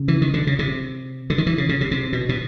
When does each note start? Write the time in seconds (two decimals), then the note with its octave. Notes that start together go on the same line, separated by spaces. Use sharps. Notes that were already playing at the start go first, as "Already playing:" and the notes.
Already playing: C#3
0.08 E3
0.22 D#3
0.34 D3
0.47 C#3
0.59 C3
1.30 D3
1.38 D#3
1.47 E3
1.58 C#3
1.69 C#3
1.81 C3
1.91 C3
2.13 B2
2.29 B2